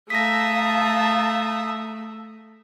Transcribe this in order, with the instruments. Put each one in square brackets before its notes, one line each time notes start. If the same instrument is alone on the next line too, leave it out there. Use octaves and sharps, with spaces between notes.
[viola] A3 [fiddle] E5 D#6 [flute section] F5 A5 A#5 [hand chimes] A#6 B6